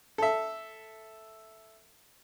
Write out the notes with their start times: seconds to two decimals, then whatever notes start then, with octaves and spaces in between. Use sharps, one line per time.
0.18 A4 E5